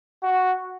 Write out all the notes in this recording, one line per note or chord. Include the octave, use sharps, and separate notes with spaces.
F#4